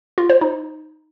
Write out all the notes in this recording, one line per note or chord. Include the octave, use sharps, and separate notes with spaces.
F4
C5
D#4